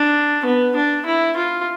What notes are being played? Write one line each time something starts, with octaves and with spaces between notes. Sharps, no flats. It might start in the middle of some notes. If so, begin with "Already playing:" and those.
Already playing: D4
B3
D4
E4
F4